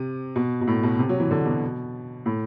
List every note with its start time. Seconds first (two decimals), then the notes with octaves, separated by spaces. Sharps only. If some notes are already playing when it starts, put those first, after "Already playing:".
Already playing: C3
0.36 B2
0.61 B2
0.67 A2
0.83 B2
0.99 C3
1.09 F#3
1.20 E3
1.31 D3
1.46 B2
2.26 A2